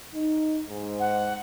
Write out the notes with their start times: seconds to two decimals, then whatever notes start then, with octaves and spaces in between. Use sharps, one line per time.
0.14 D#4
0.69 G#2
1.00 F#5